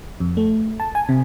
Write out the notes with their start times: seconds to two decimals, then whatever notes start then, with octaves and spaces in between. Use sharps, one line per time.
0.20 F2
0.37 A3
0.80 A5
0.95 G#5
1.09 C3